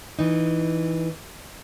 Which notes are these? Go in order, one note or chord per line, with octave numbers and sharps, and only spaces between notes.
E3 D#4